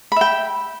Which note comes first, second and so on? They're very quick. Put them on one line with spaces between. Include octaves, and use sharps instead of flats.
B5 E5 G5